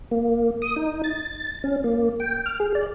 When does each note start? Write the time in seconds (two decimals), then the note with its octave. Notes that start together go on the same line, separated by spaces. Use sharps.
0.11 A#3
0.62 D#6
0.76 D#4
1.04 A6
1.64 C#4
1.84 A#3
2.20 G5
2.46 F6
2.60 G#4
2.75 D5